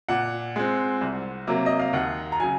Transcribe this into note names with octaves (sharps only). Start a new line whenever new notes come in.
A#2 F#5
G#3 C4
C2
C3 F#3 A#3
D#5
F5
D#2 F#5
A#5
C#3 F#3 G#5